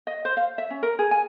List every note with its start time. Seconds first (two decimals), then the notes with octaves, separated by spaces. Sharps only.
0.07 D#5
0.25 C5
0.37 F5
0.58 E5
0.70 C#4
0.83 A#4
0.99 G#4
1.11 G#5